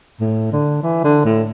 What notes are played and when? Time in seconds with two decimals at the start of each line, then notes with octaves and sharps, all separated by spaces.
0.20 A2
0.52 D3
0.83 E3
1.04 D3
1.25 A2